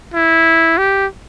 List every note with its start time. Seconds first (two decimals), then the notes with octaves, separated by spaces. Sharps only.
0.14 E4
0.78 G4